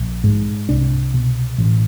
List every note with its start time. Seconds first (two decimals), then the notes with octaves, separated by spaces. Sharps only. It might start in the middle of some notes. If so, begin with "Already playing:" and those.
Already playing: A#1
0.24 G#2
0.69 C2 D4
1.14 B2
1.58 A1